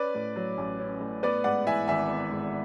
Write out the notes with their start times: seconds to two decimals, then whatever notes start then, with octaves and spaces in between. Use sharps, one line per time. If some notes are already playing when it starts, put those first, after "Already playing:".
Already playing: C#4 B4 D5
0.15 A2
0.36 F#3
0.58 A1
0.80 C#4
1.01 A2
1.23 B3 B4 D5
1.44 G#2 D5 F#5
1.66 E3 E5 G#5
1.88 G#1 E5 G#5
2.09 B3
2.31 G#2